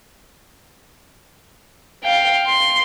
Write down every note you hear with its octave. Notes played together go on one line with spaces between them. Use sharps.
F5 G5
C6